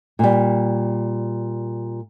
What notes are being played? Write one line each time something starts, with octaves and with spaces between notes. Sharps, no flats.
A#2 G3